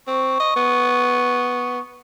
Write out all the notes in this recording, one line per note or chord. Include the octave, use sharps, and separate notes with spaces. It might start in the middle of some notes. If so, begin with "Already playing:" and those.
C4 C#6
D#5
B3